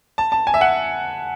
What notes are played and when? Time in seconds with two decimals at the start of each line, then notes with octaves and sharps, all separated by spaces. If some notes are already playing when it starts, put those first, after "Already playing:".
0.18 A5
0.32 A5
0.47 G#5
0.54 E5
0.61 F#5